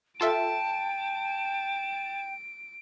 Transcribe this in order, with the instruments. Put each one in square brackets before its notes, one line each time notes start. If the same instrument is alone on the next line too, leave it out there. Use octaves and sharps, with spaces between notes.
[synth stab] F4 A4 E5 [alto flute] G5 [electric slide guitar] A5 [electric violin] D7